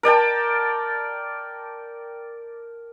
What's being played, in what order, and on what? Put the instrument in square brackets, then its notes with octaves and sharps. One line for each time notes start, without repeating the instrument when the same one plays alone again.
[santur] A#4 D5 G5 A5